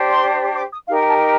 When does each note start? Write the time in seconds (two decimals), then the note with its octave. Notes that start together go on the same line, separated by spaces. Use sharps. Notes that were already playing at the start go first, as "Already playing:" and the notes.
Already playing: D4 G4 C5
0.10 C6
0.56 D6
0.71 D#6
0.86 D#4 G4 A#4 F5
0.97 G5
1.08 A5
1.17 G5